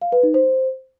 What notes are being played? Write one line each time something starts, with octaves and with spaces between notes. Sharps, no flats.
F5
B4
D#4
C5